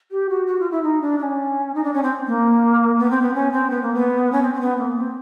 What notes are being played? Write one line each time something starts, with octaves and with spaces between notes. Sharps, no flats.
G4
F#4
F#4
F4
E4
D#4
D4
D4
C#4
D#4
D4
C#4
C4
A#3
B3
C4
B3
C#4
C4
B3
A#3
B3
C#4
C4
C4
B3
A#3
C4